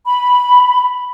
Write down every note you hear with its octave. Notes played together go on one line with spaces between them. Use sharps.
B5